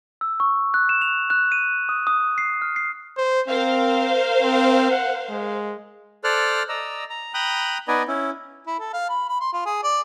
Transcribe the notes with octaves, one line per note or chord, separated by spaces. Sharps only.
E6
C#6
F#6
E7
F7
F#6
D#7
D#6
D#6
C7
F6
C7
C5
C4 A#4 C5 F5
C4
F#5
G#3
A4 C5 D5 F6 F#6
D5 D#5 A#5 E6
A#5
G5 A#5 B5 D#6 F#6
B3 D#4 B4 D5 D#5 G#5
C#4 E4
E4
A4
F5
B5
B5
C6
F4
G#4
D5